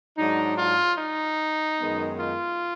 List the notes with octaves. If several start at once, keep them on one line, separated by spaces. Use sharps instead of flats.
G#2 F#3 D4 D#4
F4
D#4
F#2 D#3 G#3 B3
F4